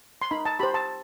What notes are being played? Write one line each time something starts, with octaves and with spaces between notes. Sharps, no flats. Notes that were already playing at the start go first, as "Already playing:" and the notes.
C6
D#4 B5
A5
G4 C5 B5
A5